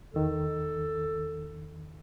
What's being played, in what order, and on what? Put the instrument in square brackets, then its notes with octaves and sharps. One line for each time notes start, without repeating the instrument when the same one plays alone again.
[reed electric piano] E2 D#3 [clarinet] A4